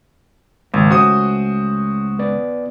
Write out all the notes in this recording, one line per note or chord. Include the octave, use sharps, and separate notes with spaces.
G#1 C#2
A3 C#4 F#4 C5 D#6
B3 B4 D5